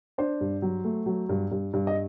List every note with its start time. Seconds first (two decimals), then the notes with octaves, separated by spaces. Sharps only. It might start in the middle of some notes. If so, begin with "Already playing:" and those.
0.18 D4 C5
0.41 G2
0.62 F#3
0.84 A3
1.06 F#3
1.29 G2
1.51 G2
1.73 G2
1.87 D#5